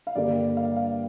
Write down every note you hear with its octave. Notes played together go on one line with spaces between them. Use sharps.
F5
G2 D3 G3 A#3 D5
F5
F5